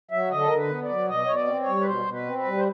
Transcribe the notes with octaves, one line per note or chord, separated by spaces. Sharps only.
F#3 E5
D3 D#5
A4
D3 A#4
B4
B3
D5
F#3
B2 D#5
B2 C#5
D5
C4
C#5
G3
B4
B2 C5
B2
B4
C4
B4
G3
C5